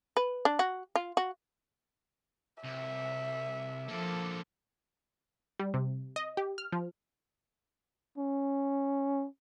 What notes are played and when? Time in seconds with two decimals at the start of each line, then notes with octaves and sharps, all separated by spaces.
0.17 B4
0.45 D4
0.59 F#4
0.95 F4
1.17 F#4
2.64 C2 E5
3.88 D3 F3 A#3 A4
5.59 G3
5.74 C3
6.16 D#5
6.37 G4
6.58 F6
6.72 F3
8.18 C#4